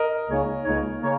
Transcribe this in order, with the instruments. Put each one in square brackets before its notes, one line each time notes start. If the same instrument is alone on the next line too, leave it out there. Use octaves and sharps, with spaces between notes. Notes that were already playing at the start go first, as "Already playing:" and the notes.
Already playing: [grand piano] A#4 D#5
[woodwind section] C#2 C#3 A#3 D#4 C#5
C#2 C#3 A#3 D#4 C#5
C#3 A#3 C#5